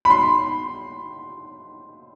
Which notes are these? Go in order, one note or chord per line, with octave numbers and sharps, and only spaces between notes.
B5
C6